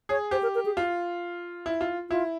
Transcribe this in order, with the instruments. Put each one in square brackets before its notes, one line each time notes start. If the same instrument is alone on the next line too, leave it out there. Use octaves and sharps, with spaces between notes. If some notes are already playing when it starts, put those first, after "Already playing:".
[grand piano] G#4 [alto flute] C#5
[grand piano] G4 [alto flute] C5
[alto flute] A#4
A#4
G#4
[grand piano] F4
E4
F4
[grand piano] E4 [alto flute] F4